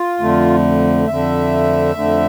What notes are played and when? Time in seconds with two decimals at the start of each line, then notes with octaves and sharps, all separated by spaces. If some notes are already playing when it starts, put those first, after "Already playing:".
Already playing: F4
0.19 F2 D3 A3
1.07 F2 D3 A3 E5
1.95 F2 D3 A3